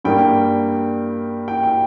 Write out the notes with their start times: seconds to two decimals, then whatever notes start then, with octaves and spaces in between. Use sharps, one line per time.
0.04 G2 G3 A#3 G5
1.48 G5
1.63 G5